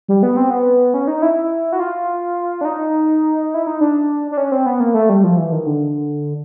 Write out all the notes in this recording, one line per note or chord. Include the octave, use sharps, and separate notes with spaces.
G3
B3
C4
B3
C#4
D#4
E4
F#4
F4
D4
D#4
E4
D#4
D4
D4
C#4
C4
B3
A#3
A3
G3
F3
E3
D#3
D3